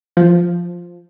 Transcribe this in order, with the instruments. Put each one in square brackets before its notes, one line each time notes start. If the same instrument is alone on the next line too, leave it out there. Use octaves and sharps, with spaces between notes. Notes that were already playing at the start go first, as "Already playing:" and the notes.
[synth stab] F3